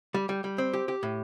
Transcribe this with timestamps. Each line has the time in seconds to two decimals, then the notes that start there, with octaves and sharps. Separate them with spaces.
0.14 G3
0.29 G3
0.44 G3
0.58 C4
0.73 G4
0.88 G4
1.03 A2